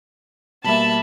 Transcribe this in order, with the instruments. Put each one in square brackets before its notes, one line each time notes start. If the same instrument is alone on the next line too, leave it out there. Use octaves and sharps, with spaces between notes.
[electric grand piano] B2 G3 A#3 [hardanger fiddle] E5 B5 [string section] A5